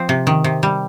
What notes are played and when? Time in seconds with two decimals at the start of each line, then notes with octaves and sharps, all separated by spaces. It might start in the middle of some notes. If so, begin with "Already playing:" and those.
Already playing: F3 C4
0.09 C3
0.27 D#3
0.44 C3
0.63 G3